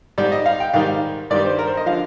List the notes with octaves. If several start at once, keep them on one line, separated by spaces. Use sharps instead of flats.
G#2 G3 D5
D#5
F5
G5
G#2 D#3 G3 F5
G2 D#3 G3 D5
C5
A#4
C5
D#5
D3 F3 F5